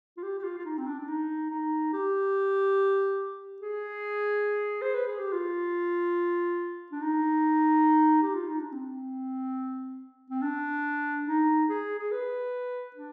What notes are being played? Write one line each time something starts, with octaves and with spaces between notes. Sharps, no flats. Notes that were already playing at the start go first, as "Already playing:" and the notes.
F4
G4
G4
F4
F4
D#4
C4
D4
D4
D#4
D#4
G4
G#4
C5
B4
G#4
G4
F4
D4
D#4
G4
F4
D#4
D4
C4
C4
D4
D#4
G#4
G#4
B4
D4